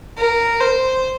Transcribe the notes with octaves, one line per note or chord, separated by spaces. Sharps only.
A#4
C5